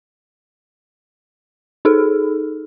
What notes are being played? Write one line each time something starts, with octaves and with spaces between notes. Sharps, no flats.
D#4 G#4 A4